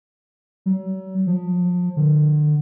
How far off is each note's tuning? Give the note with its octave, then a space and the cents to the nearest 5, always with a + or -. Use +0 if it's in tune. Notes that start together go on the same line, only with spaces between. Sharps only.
F#3 +40
F3 +30
D3 +35